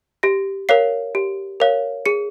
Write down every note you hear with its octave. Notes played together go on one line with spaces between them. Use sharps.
G4 A#6
A#4 C#5 F5 C7
G4
A#4 C#5 F5
G#4 C#7